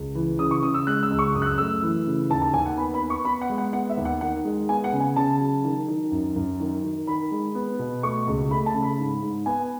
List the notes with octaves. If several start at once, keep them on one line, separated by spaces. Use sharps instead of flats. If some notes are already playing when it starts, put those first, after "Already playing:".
Already playing: C#2
E3
C#3 D#6
C#6
C#3 D#6
E6
G#3 F#6
E6
C#2
C#6
F#2 D#6
F#6
E6
A3 E6
E3
C#3
D#2 A5
A5
D#2 G#5
F#5
B3 B5
B5
B3
C#6
B3 B5
F#5
G#3
F#5
B3 F#5
E5
D#2
F#5
D#3 F#5
G#3
B3 G#5
F#5
C#3
G#5
C#3 A5
F#3
D#3
D#3
F#2
F#2
D#3
D#3
D#3 B5
G#3
B3
B2
A3 C#6
C#2
A3 B5
A5
C#3
B5
G#2
G#2
B3 G#5